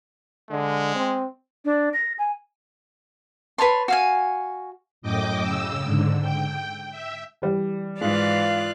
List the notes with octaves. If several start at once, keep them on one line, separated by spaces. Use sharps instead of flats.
D3 G#3
C4
D4
A#6
G#5
B4 C#5 A5 C6
F#4 F5 G#5
F#2 A2 D#5 G5 D6
C#3 E6
G#2 D3
G5
E5
E3 G3
G#2 E3 G#3 F4 D5 F5 F#6